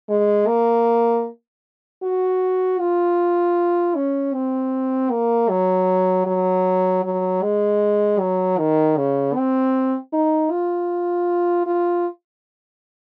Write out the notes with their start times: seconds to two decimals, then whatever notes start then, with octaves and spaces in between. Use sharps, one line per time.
0.09 G#3
0.47 A#3
2.03 F#4
2.80 F4
3.96 C#4
4.34 C4
5.11 A#3
5.49 F#3
6.26 F#3
7.04 F#3
7.43 G#3
8.20 F#3
8.59 D#3
8.97 C#3
9.35 C4
10.13 D#4
10.51 F4
11.66 F4